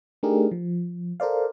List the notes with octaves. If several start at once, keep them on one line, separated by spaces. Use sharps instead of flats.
A3 D4 D#4 G4 G#4 A#4
F3
A4 A#4 C5 D5 F5